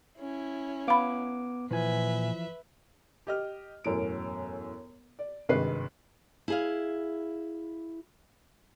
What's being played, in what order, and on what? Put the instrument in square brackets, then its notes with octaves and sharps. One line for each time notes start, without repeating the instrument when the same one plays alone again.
[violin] C#4 E4
[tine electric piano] B3 D6 [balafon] F5 B5
[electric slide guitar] A#2 G#5 [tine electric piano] E3 F3 [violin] B4 E5
[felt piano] G4 D#5 F6
E1 F#2 A2 D7
D5
G#1 G2 C3 G#3 B4 C7
[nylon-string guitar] E4 G#4 F5